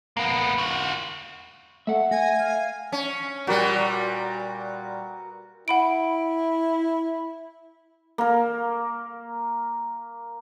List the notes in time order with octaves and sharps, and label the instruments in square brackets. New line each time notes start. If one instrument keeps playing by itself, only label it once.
[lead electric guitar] A#3 B3
F4 F#4
[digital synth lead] A3 [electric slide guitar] E5 F#5
[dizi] G#5 [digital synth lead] A#6
[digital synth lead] F5
[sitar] C#4
[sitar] A#2 G3 [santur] F#4 A#4 B4
[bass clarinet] E4 [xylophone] F#5 B5 D7
[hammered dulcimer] A#3 A#4